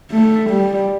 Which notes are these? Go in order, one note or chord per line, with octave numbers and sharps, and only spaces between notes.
A3
G3